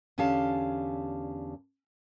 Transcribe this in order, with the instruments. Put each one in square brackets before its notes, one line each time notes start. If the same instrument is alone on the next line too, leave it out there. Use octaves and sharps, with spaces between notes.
[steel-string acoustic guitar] E2 D3 C#4 G4 F5 A5